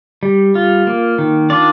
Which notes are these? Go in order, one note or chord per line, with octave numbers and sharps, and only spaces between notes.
G3
F4
A#3
D#3
D4 F4 D5